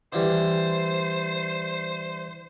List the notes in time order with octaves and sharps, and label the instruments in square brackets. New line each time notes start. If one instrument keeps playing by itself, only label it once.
[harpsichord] D3 E3 G3 [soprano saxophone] C5